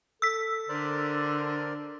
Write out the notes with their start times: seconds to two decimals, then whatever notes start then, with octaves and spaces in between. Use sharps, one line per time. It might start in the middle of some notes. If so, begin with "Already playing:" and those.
0.22 A4 E6 B6
0.69 D3 A#4 C5 D5